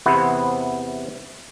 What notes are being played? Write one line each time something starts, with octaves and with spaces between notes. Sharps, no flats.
E2 C3 B3 E4 C5 F#5